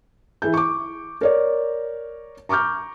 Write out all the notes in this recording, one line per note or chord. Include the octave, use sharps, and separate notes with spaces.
E3 E4 G#4 G6
C#6 D6
A#4 C#5 D5
A#5 C#6 D6 F6 G6